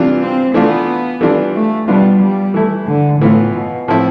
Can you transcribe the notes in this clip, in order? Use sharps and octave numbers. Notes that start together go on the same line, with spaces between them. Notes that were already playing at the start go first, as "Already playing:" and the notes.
Already playing: C3 E3 G3 D4 F4
C4
E3 A3 B3 D4 F4
E3 G3 D4 F4
A3
B2 G3 B3 D4 F4
G3
E3 A3 E4
D3
A2 E3 B3 F4
B2
A2 F3 C4 E4